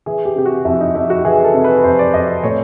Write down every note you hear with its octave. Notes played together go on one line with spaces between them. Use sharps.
E3 G#4
G4
C3 G4
F#4
F2 E4
D#4
F2 E4
F#4
E3 G#4
A4
C3
B4
F2 C5
D5
F2 D#5
D5
A2 C#5